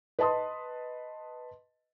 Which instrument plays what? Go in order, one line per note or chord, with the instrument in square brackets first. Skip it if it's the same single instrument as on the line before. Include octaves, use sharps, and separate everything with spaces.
[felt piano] B4 D#5 A5 C6 D#6